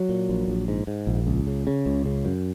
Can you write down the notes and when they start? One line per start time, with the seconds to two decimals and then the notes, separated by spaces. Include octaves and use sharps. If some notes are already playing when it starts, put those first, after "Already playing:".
Already playing: F#3
0.09 A#2
0.29 A#1
0.48 A#1
0.68 G#2
0.87 G#2
1.07 A#1
1.27 C#2
1.47 C#3
1.67 C#3
1.86 C#2
2.06 C#3
2.25 F#2